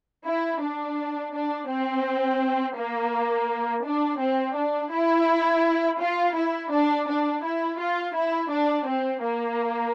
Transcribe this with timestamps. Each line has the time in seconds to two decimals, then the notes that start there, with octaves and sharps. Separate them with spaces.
0.25 E4
0.61 D4
1.34 D4
1.70 C4
2.77 A#3
3.85 D4
4.20 C4
4.56 D4
4.93 E4
6.01 F4
6.36 E4
6.72 D4
7.08 D4
7.44 E4
7.80 F4
8.16 E4
8.51 D4
8.87 C4
9.23 A#3